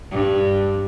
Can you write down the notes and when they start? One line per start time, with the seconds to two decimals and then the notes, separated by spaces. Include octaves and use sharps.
0.11 G2